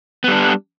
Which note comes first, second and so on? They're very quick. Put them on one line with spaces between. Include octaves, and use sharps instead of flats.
B3 G3 D4